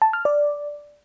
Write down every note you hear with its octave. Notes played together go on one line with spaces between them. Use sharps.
A5
F6
D5